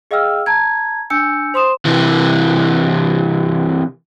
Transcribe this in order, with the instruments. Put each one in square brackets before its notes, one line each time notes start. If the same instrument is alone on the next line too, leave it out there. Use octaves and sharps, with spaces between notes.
[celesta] G#4 D#5 F5 G5 E6 F6
A5 A#5 G#6
D4 G#5 E6 G6 C#7
C5 C6 D#6 E7
[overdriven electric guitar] C3 E3